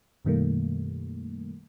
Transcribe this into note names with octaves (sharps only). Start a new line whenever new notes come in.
F#2 B2 D#3 G3 A3 A#3